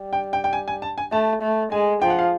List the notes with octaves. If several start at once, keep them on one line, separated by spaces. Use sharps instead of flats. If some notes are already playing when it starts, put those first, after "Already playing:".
Already playing: G3
G5
G5
G5
G#5
G#5
A5
G#5
A3 A5
A3
G#3 G#5
F3 G5
F#5
F5